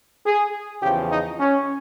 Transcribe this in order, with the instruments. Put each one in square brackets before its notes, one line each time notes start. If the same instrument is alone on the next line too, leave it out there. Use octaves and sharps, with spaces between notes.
[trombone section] G#4
E2 C#3 F3 G4
D#4
C#4